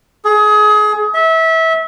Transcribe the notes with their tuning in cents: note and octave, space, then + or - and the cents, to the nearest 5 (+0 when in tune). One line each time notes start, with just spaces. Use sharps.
G#4 +25
E5 -25